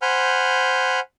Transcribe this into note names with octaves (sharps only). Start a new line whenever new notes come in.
C5 F#5 G#5 B5 F6 G6